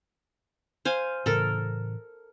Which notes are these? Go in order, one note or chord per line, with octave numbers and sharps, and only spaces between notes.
C5 F5 G#5
A2 C#3 E3 A4 A#4